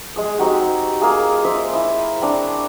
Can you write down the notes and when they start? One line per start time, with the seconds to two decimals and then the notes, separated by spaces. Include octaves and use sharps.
0.16 G#3 G#4 D#6
0.38 C4 D#4 F#4 G4
1.01 A#3 F4 G#4 F5
1.45 C5 D#5 E5 C6
1.73 E4 D#6
2.21 C4 D4 A#5 C#6